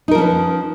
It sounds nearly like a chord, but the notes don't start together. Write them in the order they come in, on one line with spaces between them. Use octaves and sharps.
D#4 A#4 F3 C#4 B4